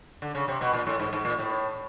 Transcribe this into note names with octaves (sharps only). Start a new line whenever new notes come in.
D3
C#3
C3
B2
A#2
A2
G#2
G#2
A#2
A2